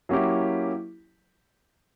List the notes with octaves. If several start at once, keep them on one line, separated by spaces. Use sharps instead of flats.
F#3 A#3 C#4 E4 G4